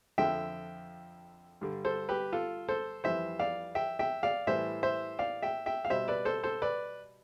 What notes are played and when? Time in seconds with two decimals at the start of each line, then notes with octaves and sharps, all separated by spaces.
0.18 F2 D3 F3 E5 G5
1.61 G2 D3 G3
1.85 A4 C5
2.09 G4 B4
2.33 F4 A4
2.69 A4 C5
3.04 F2 E3 G3 C5 E5
3.39 D5 F5
3.75 E5 G5
3.99 E5 G5
4.23 D5 F5
4.47 A2 E3 G3 C5 E5
4.83 C5 E5
5.19 D5 F5
5.42 E5 G5
5.66 E5 G5
5.85 F5
5.90 B2 G3 C5 E5
6.08 B4 D5
6.25 A4 C5
6.43 A4 C5
6.62 B4 D5